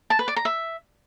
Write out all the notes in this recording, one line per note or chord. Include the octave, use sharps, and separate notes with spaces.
A5
B4
D5
A#5
E5